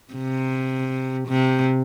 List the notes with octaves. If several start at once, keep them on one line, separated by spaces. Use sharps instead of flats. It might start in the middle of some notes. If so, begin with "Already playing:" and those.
C3
C3